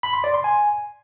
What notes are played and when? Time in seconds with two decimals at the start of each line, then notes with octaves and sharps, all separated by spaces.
0.03 B5
0.14 C6
0.24 D5
0.34 C6
0.44 G#5